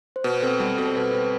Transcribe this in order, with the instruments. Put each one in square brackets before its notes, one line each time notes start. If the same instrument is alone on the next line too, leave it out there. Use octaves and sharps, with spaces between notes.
[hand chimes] C5
[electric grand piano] B2 [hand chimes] B4
[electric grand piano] C4 [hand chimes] A4
[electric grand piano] G3 [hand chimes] G4
[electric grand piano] B2 [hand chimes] A4
[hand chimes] C5
[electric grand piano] B2 [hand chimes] B4
[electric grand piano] C4